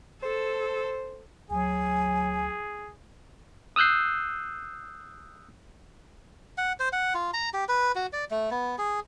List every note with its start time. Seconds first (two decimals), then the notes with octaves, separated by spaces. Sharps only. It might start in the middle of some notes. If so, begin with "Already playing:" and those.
0.23 A4 C5
1.50 D2 F#3 G#4 G#5
3.76 D#6 E6 F#6 G6 C7
6.58 F#5
6.80 C5
6.93 F#5
7.14 F4
7.34 A#5
7.54 G4
7.69 B4
7.95 F#4
8.13 D5
8.31 A3
8.51 B3
8.78 G#4